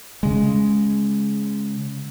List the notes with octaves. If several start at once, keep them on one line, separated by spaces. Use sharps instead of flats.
C#3 G#3